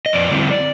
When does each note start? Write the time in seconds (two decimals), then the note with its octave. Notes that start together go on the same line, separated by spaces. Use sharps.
0.06 D#5
0.13 F2 D5
0.31 D3 G3 C4 E4